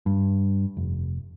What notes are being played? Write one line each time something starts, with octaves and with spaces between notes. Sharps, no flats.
G2
F1